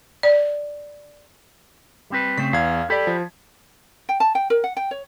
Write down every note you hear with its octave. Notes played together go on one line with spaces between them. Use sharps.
D5
G3 C4 B4
C#3 A3 C4 B6
E2 F5 G#6
G4 A4 D5 B5
F3
G5
A5
G5
A#4
F#5
G5
C#5